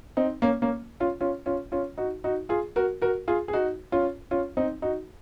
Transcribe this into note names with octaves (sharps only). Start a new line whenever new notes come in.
C4 D#4
A#3 C#4
A#3 C#4
C#4 F4
C#4 F4
C#4 F4
C#4 F4
D#4 F#4
D#4 F#4
F4 G#4
F#4 A#4
F#4 A#4
F4 G#4
G#4
D#4 F#4
C#4 F4
C#4 F4
C4 D#4
D#4 F#4